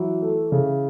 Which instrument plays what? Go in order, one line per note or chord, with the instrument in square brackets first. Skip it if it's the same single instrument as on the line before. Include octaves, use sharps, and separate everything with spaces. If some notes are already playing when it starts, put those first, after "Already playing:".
Already playing: [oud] E3 [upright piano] F#3
[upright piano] A3
C#3